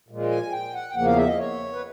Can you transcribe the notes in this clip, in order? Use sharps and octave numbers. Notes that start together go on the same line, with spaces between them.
A#2 F3 G#3
G#5
G5
F#5
G5
E2 C#3 F3 A#3 F#5
F5
E5
D#5
C#5
B4